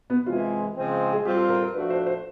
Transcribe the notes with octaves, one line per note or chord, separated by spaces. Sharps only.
B3
C3 E3 G#3 C4 F4
C#3 F3 G#3 C4
G#4
G3 C4 F4 G4
A4
A#4
A#4
F3 A3 D4 F#4 B4
C5
C5